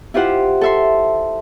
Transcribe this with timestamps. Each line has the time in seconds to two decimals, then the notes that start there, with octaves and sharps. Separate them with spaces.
0.14 E4 F4 G4 C5 F#5
0.61 A4 E5 C6